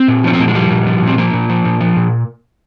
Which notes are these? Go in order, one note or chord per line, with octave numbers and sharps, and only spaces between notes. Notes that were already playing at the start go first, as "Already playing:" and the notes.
Already playing: C4
A#2
F3 C#4
C4
A#2 A#3
G#3
F3 G3
A#2
F3
A#2
C4
F3 A#3
A#2
F3
A#2
F3
A#2